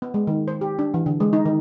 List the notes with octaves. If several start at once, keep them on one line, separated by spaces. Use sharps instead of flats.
B3
G#3
D#3
C5
G4
D4
E3
D3
G#3
D#4
D#3